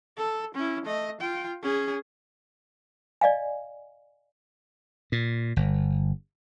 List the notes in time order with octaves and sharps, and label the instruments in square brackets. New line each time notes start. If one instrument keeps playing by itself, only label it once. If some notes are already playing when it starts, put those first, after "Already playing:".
[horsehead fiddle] A4
C#4 E4
A3 D#5
F4 G5
C#4 G#4
[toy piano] D5 D#5 F5 G#5
[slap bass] A#2
G1